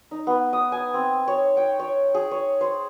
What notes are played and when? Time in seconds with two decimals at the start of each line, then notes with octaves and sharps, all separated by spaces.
0.11 D#4
0.27 B3
0.53 D#6
0.72 G#5
0.94 C4
1.28 C#5
1.57 G5
1.80 C#5
2.14 G#4
2.31 C#5
2.61 C5